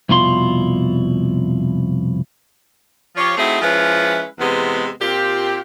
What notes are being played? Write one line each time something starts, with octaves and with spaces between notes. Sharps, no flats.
C2 F2 B2 E4 F4 C6
F3 F4 G4 C#5
A3 C4 D#4 E4 F#4 G#4
F3 G#3 C#4 E4 B4
E2 C3 G#3 B3
A#2 C4 F4 G4